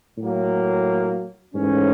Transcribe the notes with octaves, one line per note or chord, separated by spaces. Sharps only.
A2 F#3 A#3
G#2 E3 A3 C#4